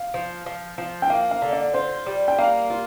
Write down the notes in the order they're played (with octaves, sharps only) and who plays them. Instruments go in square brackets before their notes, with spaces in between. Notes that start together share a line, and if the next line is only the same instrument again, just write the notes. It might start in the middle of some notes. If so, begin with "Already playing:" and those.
Already playing: [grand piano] F5
[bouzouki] F3
F3
F3
[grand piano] G5
[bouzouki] A#3 [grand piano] F5
[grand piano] F5
[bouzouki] D3
[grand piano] D5
[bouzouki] F4 [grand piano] C5
[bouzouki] G3
[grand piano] G5
[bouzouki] A#3 [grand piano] F5
[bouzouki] F4